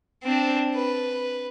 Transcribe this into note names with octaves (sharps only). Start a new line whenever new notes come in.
C4 D4
B4